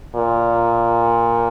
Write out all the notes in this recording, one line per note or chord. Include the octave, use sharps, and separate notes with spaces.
A#2